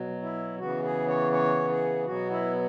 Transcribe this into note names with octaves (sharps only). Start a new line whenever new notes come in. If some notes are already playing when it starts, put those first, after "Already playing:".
Already playing: B2 F#3
E4
C#3 E3 B3 F#4
G#4
C#5
C#5
G#4
B2 F#3 B3 F#4
E4